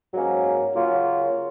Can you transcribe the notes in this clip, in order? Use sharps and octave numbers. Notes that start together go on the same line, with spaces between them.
G#2 F#3 A#3 C#4
C#3 F#3 A#3 C#4 F4